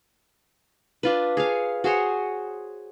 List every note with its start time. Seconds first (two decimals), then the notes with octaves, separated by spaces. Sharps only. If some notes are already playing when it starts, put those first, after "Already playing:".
1.03 D4 F4 B4
1.37 G#4 C#5 F5
1.84 F#4 G#4 C5 C#5